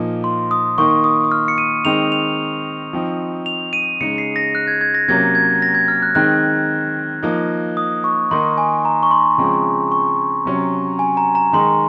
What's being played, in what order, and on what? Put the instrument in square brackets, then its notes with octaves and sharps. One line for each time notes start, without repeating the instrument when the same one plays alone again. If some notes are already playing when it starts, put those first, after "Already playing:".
Already playing: [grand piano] A#2 F3 A#3 D#4
[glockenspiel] C6
D#6
[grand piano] D#3 A#3 D#4 [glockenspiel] C#6
[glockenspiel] D#6
D#6
F6
C#7
D#7
[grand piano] D#3 G#3 C4 D#4 [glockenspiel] F7
[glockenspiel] F7
[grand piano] F3 C4 D#4
[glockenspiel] F7
D#7
[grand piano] C#3 G#3 D#4 [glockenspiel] C#7
[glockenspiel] C7
A#6
F#6
G#6
G#6
A#6
[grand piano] C3 F#3 A#3 C#4 [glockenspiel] G#6
[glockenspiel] G#6
A#6
G#6
F6
F#6
[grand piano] D#3 G#3 C4 D#4 [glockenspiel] F#6
[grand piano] F3 A#3 D#4
[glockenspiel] D#6
C#6
[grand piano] D#3 A#3 D#4 [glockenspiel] C6
[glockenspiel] G#5
A#5
C#6
C6
[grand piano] C#3 F3 G#3 C4
[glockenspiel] C#6
[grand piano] C3 F#3 C#4
[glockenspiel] G#5
A#5
A#5
[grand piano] D#3 G#3 D#4 [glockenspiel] C6